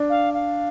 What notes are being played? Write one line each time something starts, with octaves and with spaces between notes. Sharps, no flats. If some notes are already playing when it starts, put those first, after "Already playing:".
Already playing: D4
F5
F5